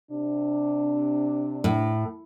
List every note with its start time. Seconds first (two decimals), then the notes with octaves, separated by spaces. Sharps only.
0.11 C3 D4
1.64 A2